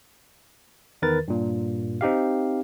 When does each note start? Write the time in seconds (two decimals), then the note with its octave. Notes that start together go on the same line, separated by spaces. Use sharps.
1.02 E2 D#3 A#4 B4 A6
1.28 G2 A#2
2.01 C4 D#4 G4 F5